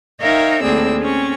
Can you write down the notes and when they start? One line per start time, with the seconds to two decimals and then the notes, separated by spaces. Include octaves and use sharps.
0.21 D#4 A#4 C#5 E5 F5 G5
0.62 D#2 A2 C4 G#4 D5 E6
1.00 C4 C#4 G#4 C#6